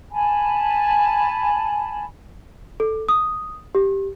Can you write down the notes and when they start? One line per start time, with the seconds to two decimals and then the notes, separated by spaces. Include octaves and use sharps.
0.12 G#5 A5 B5
2.80 A4
3.09 D#6
3.75 G4